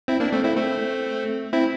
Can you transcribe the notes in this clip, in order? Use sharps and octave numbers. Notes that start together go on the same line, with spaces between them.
C4 E4
A#3 D4
A3 C4
C4 E4
A3 C4
C4 E4